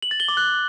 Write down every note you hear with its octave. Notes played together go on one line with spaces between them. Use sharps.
F#7
A6
G7
D6
F#6